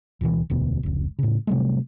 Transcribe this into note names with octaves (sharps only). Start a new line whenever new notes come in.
D1 B2 D#3 E3
E1 D2 B2
F1 C#2
A2 C#3
C3 F#3 G3 A3